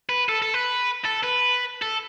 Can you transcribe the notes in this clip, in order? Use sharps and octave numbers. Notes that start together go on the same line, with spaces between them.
B4
A4
A4
B4
A4
B4
A4